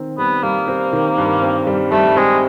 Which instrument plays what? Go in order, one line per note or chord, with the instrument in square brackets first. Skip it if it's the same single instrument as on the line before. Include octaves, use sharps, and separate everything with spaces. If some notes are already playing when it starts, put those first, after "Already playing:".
Already playing: [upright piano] D#3 C4
[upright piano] G3 [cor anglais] B3
[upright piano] G3 [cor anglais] A#3
[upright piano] C4
D#3
G2
C4
G3
[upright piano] G3 [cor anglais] A3
[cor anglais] G#3 [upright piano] C4